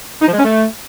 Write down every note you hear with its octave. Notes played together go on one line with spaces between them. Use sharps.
D#4
F3
G#3
C#4
A3